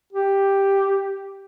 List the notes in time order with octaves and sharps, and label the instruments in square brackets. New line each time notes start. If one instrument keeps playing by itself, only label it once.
[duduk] G4